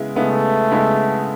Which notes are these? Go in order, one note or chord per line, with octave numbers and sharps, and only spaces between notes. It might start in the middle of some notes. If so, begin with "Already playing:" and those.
Already playing: C#3 G#3 B3 E4
C#3 G#3 A3 B3 E4
C#3 G#3 B3 E4